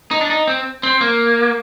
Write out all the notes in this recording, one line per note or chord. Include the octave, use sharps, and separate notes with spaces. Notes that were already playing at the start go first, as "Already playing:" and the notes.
D#4
D4
D#4
C4
C4
A#3